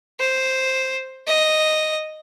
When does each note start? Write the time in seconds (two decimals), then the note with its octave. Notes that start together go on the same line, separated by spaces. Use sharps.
0.20 C5
1.27 D#5